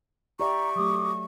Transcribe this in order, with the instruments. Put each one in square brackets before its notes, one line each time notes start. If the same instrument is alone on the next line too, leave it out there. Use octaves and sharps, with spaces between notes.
[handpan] G4 D5 E5 [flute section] A#5 [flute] C#6
[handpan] F#3 A3 [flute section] G4 D6 D#6